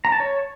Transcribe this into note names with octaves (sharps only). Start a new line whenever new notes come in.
A#5
A5
C#5